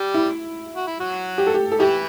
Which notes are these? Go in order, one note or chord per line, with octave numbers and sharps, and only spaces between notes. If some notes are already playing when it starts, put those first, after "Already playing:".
Already playing: G3 G4
E4
F#4
E4
F#3 F#4
G4
A4
G4
A4
E3 E4 G4